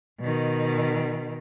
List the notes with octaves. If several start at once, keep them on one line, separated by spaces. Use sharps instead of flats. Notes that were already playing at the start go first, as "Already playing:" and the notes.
B2 D#3